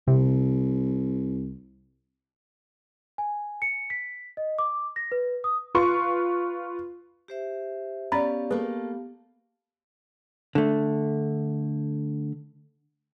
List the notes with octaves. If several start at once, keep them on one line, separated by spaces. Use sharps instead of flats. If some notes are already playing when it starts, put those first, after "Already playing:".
C2 C3
G#5
C#7
B6
D#5
D6
A#6
B4
D#6
F4 B4 C6 C#6
G4 C5 E5
B3 C#4 G4 D5 F5 A#5 B5 A6
A3 A#3 G#4 B4
D3 A3